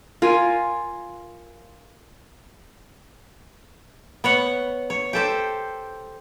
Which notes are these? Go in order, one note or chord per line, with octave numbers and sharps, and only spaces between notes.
F4 A#4 G#5
B3 C#5 F#5
C#5
G4 A4 C5